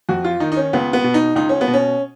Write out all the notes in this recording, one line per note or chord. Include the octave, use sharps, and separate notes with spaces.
F2 F#4
F4
D#3 D#4
D#4
C#4
C#2 B3
B3
B2
D#4
C#2 D#4
C#4
B3
B2
C#4